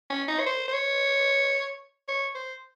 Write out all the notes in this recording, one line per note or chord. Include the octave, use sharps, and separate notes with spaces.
C#4
D#4
C#5
C5
C5
C#5
C#5
C5